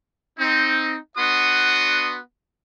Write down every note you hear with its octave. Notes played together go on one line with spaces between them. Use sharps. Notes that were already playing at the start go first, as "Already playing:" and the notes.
C4 D#4
B3 D4 F#4 F#5 C6 D#6